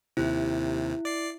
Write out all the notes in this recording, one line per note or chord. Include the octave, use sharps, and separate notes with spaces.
D#2 C3 E4
D5 C7